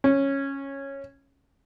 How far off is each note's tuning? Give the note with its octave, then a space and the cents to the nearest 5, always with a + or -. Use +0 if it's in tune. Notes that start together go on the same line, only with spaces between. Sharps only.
C#4 -10